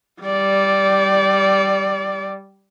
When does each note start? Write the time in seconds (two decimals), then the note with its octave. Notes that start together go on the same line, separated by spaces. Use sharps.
0.22 G3 D5